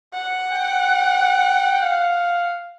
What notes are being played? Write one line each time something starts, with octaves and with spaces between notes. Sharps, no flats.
F#5
G5
F5